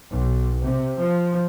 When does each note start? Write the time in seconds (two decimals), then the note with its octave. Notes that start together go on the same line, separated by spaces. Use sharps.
0.11 B1
0.63 C3
0.99 F3